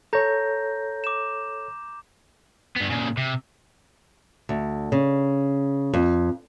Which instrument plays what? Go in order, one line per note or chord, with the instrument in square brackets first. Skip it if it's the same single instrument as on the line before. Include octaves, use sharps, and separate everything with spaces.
[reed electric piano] A4 C#5 [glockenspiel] A#5 G6 A#6
[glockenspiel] D6 E7
[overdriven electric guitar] G2 B3
A#2 C#3
C3
[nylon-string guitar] D2
C#3
F2